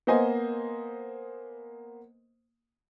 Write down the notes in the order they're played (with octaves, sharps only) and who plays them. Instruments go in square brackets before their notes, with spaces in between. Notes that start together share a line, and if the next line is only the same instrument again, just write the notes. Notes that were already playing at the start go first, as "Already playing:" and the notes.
[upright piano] A#3 B3 C5 D#5 G#5